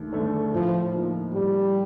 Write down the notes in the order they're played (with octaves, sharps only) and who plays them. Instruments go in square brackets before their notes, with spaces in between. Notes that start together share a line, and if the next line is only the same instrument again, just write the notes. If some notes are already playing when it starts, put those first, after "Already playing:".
Already playing: [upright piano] D#2 D3 A3
D3 A3 D4 A4
[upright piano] A2 [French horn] F3
[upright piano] F3 A#3 D#4
[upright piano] A2 [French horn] G3